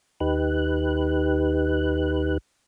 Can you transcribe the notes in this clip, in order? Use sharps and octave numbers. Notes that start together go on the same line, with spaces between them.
D#2 D#4 G4 B4 F#6